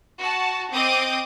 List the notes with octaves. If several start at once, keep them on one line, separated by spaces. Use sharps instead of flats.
F#4 A5
C4 D#5 D6 D#6 G6